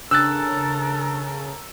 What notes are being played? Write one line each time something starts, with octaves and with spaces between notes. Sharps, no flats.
C#3 D4 A4 A#4 E6 F#6 A6